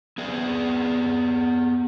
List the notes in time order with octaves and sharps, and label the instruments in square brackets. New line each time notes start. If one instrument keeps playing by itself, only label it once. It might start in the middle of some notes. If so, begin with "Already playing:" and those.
[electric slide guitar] B3 G#4 D5